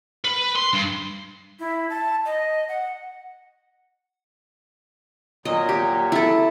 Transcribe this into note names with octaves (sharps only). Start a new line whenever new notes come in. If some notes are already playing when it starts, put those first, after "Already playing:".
B4
C6
G2
E4
A5
D#5
F#5
A#2 F#3 D#5
G4
E4 A4